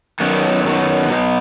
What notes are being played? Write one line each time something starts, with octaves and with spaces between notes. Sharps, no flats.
F#2 D#3 F#3 B3
F#2 D#3 F#3 B3
B2 F#3 B3